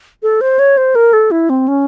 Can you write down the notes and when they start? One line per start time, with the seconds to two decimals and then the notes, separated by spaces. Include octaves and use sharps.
0.23 A4
0.41 C5
0.59 C#5
0.77 C5
0.95 A#4
1.13 A4
1.31 E4
1.50 C4
1.68 C#4